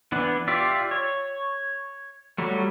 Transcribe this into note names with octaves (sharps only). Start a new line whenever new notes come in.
E3 B3 D4
F4 G4 D5 E5
C#5
F#3 G3 A3